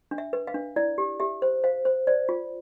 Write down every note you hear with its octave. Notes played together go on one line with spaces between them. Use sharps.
D4
E5
B4
F5
D4
E4 D5
G4
G4 E5
C5
C5 F5
C5
C5 D5
F4